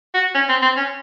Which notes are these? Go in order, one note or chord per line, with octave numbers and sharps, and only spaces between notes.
F#4
C#4
C4
C4
C#4